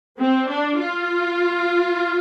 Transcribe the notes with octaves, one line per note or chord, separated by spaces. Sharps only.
C4
D4
F4